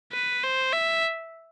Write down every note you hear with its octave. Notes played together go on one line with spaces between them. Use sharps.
B4
C5
E5